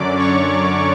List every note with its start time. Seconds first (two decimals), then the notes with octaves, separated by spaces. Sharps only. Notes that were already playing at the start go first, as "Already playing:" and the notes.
Already playing: F#2 D3 F#3 C#4 D5 D6
0.18 C#5 C#6